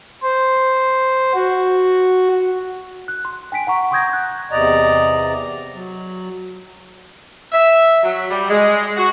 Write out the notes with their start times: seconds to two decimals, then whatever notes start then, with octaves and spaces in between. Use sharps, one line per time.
0.22 C5
1.34 F#4
3.08 F#6
3.25 C6
3.52 G5 G#5 B6 D7
3.67 F#5 A#5 C#6
3.91 C6 C#6 D#6 G6 G#6 A#6
4.13 F#6
4.51 E2 C3 D5 D#5 A#5
5.74 F#3
7.52 E5
8.03 F#3
8.31 G3
8.49 G#3
8.96 F#4